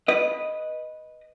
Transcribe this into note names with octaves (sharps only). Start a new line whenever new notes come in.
B4 D#5